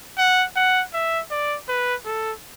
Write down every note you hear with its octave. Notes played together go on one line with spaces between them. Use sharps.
F#5
F#5
E5
D5
B4
A4